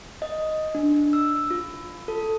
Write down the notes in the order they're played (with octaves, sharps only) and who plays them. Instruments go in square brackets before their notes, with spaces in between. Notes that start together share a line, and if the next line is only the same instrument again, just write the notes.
[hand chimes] D#5
D4
E6
F4
A4